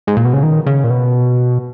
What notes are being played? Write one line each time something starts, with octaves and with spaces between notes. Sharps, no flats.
G#2
A#2
B2
C#3
D#3
C#3
A#2
B2